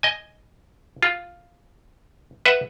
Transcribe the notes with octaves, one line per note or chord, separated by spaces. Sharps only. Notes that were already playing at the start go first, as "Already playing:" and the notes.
D#5 G#5
F4
B4 E5 F#5